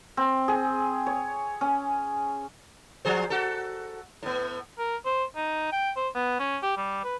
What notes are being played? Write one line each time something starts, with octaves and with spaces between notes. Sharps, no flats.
C4
G#4
C#5
C#4
F3 G#4 C5
F#4 A4
A2 B3
A#4
C5
D#4
G5
C5
B3
C#4
G4
G3
B4